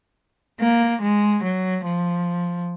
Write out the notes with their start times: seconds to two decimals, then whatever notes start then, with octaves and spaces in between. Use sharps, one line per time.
0.60 A#3
1.01 G#3
1.44 F#3
1.85 F3